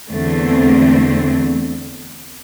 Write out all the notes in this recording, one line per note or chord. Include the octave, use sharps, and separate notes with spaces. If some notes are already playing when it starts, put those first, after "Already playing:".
E2 D3 A3 C4